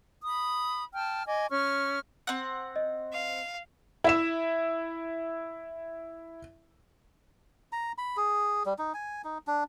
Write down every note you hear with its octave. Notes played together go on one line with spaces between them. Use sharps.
B5 D#6
G5 A5 F6
D#5 G#5 D6
C#4 C#6 F6
C4 F#5
D#5
F5
E4 E5 E7
A#5
B5
G#4
G3
D#4
G#5
D#4
D4